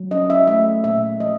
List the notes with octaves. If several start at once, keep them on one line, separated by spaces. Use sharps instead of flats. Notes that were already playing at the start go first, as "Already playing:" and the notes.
Already playing: F#3
C#4 D#5
E5
A3 E5
A#2 E5
F3 D#5